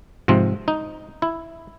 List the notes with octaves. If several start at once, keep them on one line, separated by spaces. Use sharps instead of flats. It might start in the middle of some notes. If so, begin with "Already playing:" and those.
G#2 C3 F3 C4
D#4
E4